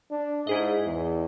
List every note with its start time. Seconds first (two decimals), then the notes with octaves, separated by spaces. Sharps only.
0.11 D4
0.47 G#2 E4 G#4 D#5
0.86 E2